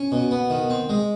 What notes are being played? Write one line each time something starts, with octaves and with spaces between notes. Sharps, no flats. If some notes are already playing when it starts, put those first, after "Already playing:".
Already playing: C#4
B2
B3
D#3
C4
G#3